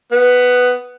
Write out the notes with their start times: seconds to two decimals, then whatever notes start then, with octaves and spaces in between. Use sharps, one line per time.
0.12 B3